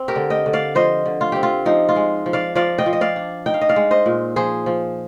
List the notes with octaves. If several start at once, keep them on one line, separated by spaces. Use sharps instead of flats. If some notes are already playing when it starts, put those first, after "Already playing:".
Already playing: C4
G4 A#4
D3
D#5 G5
D3
D5 F5
F3 C5 D#5
D3
F4
C4 G4
F4
F3 D#4
F4
G#3
F3
D5 F5
F3 D5 F5
D#5 G5
F3
D#5
D5 F5
D4
D#4 G5
F5
D#5
D5 F5
G#3
C5 D#5
A#2
F3 G#4 C5
F3